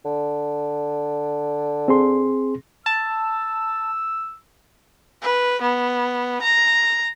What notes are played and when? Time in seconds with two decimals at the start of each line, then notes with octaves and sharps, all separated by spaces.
0.05 D3
1.88 C4 G#4 C6
2.86 A5 E6
5.22 B4
5.62 B3
6.42 A#5